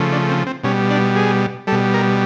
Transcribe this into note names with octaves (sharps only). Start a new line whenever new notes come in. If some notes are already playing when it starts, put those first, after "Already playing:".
Already playing: C#3 F3 A3
D4
C4
C4
B2 G3 C#4
D4
G#4
B2 G3 A4
A#4